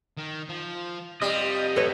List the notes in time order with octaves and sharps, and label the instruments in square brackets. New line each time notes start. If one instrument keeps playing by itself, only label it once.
[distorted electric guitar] D#3
F3
[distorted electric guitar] C3 F4 [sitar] G3 [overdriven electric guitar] D#5
[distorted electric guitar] F#2 A2 [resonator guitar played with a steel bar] A4 B4 C#5